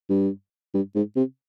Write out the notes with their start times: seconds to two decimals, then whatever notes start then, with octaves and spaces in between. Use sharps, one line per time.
0.09 G2
0.74 G2
0.95 G#2
1.16 C3